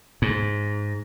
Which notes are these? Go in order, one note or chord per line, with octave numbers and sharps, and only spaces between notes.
G#2